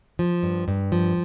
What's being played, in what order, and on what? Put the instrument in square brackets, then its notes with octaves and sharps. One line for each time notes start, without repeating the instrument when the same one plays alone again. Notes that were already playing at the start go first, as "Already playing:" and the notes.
[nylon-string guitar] F3
G2
G2
F3